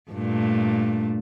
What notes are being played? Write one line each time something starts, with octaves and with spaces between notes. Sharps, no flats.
G2 A#2 A3